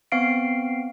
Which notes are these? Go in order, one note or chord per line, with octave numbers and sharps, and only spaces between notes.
B3 C4 F5 C7 D7